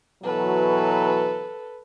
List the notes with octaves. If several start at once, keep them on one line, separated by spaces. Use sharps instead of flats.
B2 E3 F#3 A4 B4